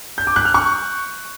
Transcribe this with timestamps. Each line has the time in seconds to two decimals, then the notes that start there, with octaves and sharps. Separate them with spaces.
0.18 G6
0.27 D6
0.36 F#6
0.45 F6
0.54 C#6